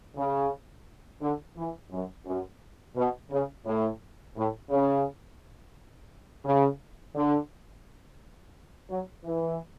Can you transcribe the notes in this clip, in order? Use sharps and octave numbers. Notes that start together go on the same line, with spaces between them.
C#3
D3
E3
F#2
F#2
B2
C#3
A2
A2
C#3
C#3
D3
F#3
E3